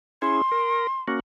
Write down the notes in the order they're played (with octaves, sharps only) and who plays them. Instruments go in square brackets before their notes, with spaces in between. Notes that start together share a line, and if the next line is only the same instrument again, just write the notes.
[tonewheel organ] C#4 E4 G#4 [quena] C6
[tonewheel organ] A#4
A#3 C#4 F#4